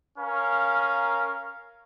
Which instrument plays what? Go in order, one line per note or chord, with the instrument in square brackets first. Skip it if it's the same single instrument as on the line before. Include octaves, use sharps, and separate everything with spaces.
[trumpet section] C#4 A#4 F5